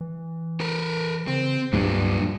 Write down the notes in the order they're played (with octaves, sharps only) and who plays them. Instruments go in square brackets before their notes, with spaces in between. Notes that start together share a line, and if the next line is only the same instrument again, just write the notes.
[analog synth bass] E3
[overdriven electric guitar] A#4 B4
[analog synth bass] C#3 [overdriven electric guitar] C4
[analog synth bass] C#2 [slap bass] G2 [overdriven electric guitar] A#2 F#3